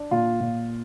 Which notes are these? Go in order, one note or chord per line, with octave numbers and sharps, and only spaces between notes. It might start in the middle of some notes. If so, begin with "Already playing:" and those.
Already playing: D4
A#2 F4
A#2